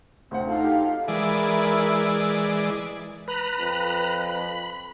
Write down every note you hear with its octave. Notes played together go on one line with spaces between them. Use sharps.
D2 C3 C4 C5 F#5
D#4 F4 A4 F5
G4
E3 G#3 E4 A#4 D5
B4 A#5 B5
F2
B5